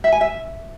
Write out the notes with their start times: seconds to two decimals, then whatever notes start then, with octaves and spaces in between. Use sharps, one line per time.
0.04 E5
0.12 G#5
0.21 E5